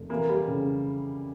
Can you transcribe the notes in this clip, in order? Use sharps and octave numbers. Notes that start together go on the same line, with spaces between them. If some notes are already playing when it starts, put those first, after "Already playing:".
Already playing: F1
E3 A#3
G3
C#3